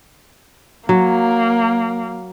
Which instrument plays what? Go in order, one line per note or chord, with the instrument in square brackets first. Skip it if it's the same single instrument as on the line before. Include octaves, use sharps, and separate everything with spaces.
[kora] F#3 [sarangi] A#3